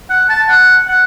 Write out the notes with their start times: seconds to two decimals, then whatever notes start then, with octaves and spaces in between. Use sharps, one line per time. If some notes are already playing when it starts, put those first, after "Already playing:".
0.10 F#5
0.29 A5
0.49 F#5
0.88 F#5